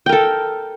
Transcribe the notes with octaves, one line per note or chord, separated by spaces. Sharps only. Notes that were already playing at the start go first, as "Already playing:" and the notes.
A4 A#4 G5